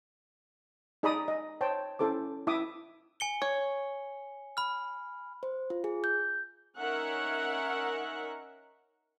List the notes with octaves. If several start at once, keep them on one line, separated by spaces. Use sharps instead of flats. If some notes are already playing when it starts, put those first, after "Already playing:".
D#4 G#4 D5 A#5 B5 D#6
D#5
C5 C#5 G5 A5
C#4 E4 A4 C5 D6
E4 E5 D6 D#6
G#5 C#7 G7
C#5
B5 F6
C5
F4
G#4
G6
C#4 D#4 A#4 E5 F#5